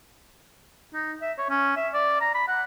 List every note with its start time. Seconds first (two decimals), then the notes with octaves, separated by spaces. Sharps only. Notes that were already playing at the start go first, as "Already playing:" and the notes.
0.94 D#4
1.22 E5
1.39 C#5
1.50 C#4
1.77 E5
1.94 D5
2.21 A#5
2.35 B5
2.48 F#5